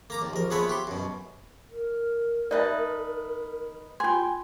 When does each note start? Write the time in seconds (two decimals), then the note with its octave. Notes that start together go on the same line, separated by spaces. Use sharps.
0.10 A#3 A#5 D6
0.22 D#2
0.33 A#1 A#4
0.50 F3 G#3 B3 B4 C#5 E5
0.69 G4 C6
0.87 F#2 B2
1.71 A#4
2.51 D#4 B4 D5 E5 A5
4.00 F4 G5 G#5 C6